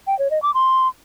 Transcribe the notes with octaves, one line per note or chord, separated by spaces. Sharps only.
G5
C#5
D#5
D6
C6